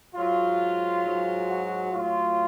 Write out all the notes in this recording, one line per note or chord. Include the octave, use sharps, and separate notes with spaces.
G#2 F#3 F4
G#2 F#3
F#4
A2 F#3 F4